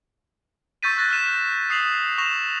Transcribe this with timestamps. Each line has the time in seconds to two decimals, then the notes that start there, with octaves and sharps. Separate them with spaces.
0.83 C#6 E6 G6 A6 B6 D#7
0.97 C#6 F#6 A6 A#6
1.10 C#6 F6 F#6 B6 D#7 E7
1.70 D#6 C7 F7 F#7
2.18 C#6 A#6 E7 F7